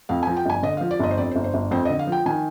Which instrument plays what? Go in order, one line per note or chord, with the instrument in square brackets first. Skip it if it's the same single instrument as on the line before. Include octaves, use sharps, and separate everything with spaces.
[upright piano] F2 [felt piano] F5
[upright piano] F3 [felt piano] G#5
[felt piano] G5
[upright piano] G1 [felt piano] G#5
[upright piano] D3 [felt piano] D#5
[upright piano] F3 [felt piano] F5
[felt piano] D5
[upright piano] G1 [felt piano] D#5
[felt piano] C5
[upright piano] F2 [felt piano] D5
[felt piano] C5
[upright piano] G1
[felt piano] C5
[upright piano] G1
[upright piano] F2 [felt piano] C5
[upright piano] D3 [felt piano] D#5
[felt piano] F5
[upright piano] F3 [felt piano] G5
[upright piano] D#3 [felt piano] G#5